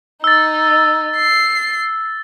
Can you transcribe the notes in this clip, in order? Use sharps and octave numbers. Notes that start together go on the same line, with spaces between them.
D#4 E6 A6
C7